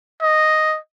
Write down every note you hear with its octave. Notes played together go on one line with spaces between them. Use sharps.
D#5